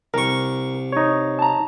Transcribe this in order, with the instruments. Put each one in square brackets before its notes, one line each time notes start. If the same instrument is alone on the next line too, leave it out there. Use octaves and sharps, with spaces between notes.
[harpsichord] C2 C#6 [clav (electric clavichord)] A#4
[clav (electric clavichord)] D#4 C#5
[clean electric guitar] A5 A#5